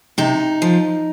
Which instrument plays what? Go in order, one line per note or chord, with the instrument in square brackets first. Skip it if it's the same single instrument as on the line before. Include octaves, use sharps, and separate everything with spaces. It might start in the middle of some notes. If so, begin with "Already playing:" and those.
[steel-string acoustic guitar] C3 D#4
F3